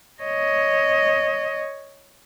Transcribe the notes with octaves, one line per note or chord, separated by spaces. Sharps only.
C#5 D#5